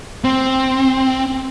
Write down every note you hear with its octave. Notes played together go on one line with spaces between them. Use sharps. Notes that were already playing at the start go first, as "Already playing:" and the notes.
C4